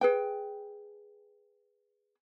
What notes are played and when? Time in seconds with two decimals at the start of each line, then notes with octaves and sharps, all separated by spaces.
0.01 G#4 B4 G5